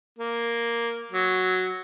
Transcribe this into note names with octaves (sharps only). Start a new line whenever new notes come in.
A#3
F#3